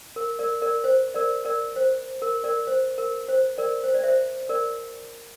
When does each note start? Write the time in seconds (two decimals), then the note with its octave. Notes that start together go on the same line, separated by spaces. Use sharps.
0.16 A#4
0.39 A#4 D5
0.62 A#4 D5
0.84 C5
1.14 A#4 D5
1.45 A#4 D5
1.76 C5
2.22 A#4
2.44 A#4 D5
2.67 C5
2.98 A#4
3.28 C5
3.58 A#4 D5
3.84 C5
3.94 D5
4.03 C5 E5
4.49 A#4 D5